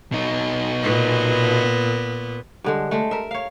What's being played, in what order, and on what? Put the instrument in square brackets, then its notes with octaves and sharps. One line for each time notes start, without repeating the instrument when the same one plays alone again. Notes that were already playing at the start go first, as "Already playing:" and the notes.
[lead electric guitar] B2 D#4
[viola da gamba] A#2 B3
[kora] G2 D3 G#3
G#3 A3
A#4 E5
C#5 F5